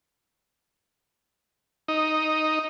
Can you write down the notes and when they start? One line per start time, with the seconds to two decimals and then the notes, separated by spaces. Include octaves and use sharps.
1.88 D#4